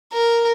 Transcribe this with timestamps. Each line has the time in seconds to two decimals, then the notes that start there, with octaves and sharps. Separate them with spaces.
0.14 A#4